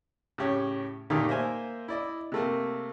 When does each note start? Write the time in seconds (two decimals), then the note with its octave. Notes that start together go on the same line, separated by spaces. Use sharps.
0.38 A2 C#3 G4 C#5
1.10 A#2 D#3 A3 A#3 D#4 G4
1.29 A#3 A#4 C5 E5 G#5
1.88 E4 D5 D#5
2.32 C3 A3 A#3